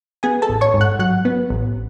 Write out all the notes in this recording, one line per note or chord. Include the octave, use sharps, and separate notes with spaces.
B3 G#4 G#5
A4 A5
A1
C#5 C#6
G#2
F#5 F#6
F#3 F#5 F#6
B3
A1